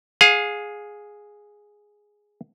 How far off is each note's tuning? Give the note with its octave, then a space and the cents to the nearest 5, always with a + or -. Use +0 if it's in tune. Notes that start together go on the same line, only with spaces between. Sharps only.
G#4 +0 F5 +30